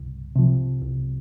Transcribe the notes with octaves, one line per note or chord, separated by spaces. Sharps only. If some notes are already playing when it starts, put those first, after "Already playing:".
Already playing: C2
C3 F3
C2